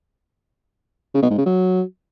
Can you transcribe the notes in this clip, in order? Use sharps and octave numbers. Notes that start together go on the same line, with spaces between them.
C#3
B2
G#2
C#3
F#3